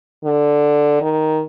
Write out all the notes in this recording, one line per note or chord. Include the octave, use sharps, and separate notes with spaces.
D3
D#3